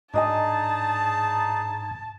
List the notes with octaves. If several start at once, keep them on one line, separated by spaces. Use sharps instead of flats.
G#2 D4 D#4 G#4 D#5 G#5 A5